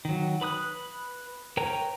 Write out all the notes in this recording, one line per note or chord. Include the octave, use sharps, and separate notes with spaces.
D#3 F#3
B4 B5 D#6 F#6
A#4 B4 C#5 G5 A#5